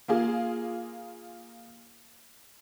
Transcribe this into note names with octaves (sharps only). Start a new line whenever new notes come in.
A#3 F4 G#4